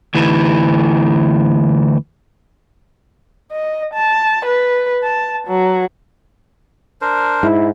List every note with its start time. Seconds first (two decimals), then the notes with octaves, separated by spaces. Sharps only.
0.15 D2 E3
3.52 D#5
3.94 A5
4.46 B4
5.04 A5
5.48 F#3
7.01 D4 A#4 C5
7.43 G#2 E4